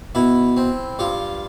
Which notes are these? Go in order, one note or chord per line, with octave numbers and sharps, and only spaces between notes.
B2 E4
C4
G2 F4